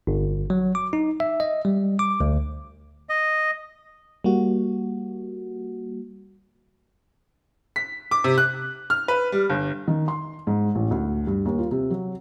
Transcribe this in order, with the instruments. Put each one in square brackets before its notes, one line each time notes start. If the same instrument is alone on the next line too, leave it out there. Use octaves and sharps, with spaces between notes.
[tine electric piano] G1
F#3
D6
D#4
E5
D#5
G3
D6
D2
[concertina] D#5
[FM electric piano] G3 A#3 F#4
[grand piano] B6
D6
C3
F#6
F6
B4
G3
G1
[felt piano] D#3
C6
G#2
A1
D2
G2
D#2
F4
C3
F#3